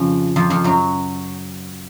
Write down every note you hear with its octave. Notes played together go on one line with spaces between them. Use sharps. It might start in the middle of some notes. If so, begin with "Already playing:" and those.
Already playing: F2 C#3 F3
F2 F3
F2 F3
F#2 F#3